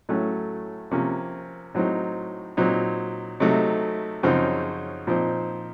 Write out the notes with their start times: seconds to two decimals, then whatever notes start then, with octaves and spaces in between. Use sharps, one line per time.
0.09 A2 F#3 A3 C#4
0.91 C3 F3 A#3 C#4
1.75 A2 F#3 C4 D#4
2.57 A#2 F#3 C4 D#4
3.40 C3 F#3 A3 D#4
4.23 F#2 C#3 F3 C4 D#4
5.07 A#2 F3 C4 D#4